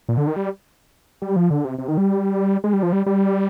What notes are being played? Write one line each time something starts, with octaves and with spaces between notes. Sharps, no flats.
A#2
D3
D#3
G3
G3
F3
D3
C3
C3
D#3
G3
G#3
G3
F3
G3
G3